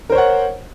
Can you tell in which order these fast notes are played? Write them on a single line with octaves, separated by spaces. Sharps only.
A#4 C5 C#5 F#5